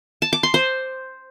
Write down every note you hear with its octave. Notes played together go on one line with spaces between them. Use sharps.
A5
D6
C6
C5